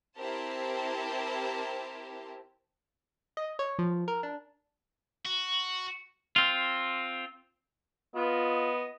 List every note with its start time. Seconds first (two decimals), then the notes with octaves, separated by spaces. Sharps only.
0.17 C4 E4 G4 A#4 C5 A5
3.37 D#5
3.59 C#5
3.79 F3
4.08 A#4
4.23 D4
5.25 F#4
6.36 C4 F4
8.15 B3 F4 D#5